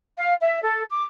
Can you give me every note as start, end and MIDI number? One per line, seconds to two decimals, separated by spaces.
0.17 0.35 77
0.40 0.61 76
0.62 0.83 69
0.89 1.04 86